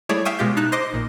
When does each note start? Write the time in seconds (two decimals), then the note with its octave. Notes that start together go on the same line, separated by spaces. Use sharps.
0.09 G3 A3 E4 G#4 C#5 D5
0.25 E5 F5 G5 G#5 C#6 D#6
0.39 B2 G#3 F4 G4 G6
0.57 D#4 A5 F#6
0.72 C5 D#5 C6 D6
0.93 A#1 A#2